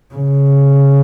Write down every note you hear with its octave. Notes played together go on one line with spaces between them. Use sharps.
C#3